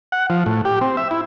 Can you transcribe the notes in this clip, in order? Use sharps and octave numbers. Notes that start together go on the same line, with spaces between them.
F#5
F3
A2
G4
C4
E5
E4